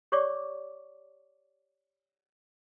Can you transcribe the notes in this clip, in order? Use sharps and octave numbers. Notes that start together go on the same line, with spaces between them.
G4 C#5 D5 C#6 D6